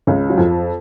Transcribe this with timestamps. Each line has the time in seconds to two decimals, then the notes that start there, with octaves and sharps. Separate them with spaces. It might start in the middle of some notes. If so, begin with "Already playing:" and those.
0.07 C#2 C#3
0.30 F#3
0.38 F2 F3